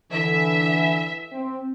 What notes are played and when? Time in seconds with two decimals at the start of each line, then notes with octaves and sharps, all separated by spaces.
0.12 D3 E3 E5
1.32 C4